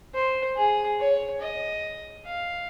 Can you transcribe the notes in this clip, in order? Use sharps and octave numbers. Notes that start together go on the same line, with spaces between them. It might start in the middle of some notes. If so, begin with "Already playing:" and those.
C5
G#4
C#5
D#5
F5